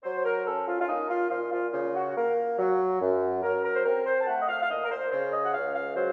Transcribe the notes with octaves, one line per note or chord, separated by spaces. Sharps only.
F#3 C5
A#4
C#4 A4
F4
F4
A#3 D#4
F4
A#2 F4
F4
C#3 F4
F#4
A#3 A#4
F#3
F#2
F#3 A#4
A#4
C5
C4 A#4
C5
A5
A3 F#5
D#5
F5
F5
A#2 D#5
A#4
C5
C#3 C5
D#5
F#5
C#2 F5
F5
F#3 C5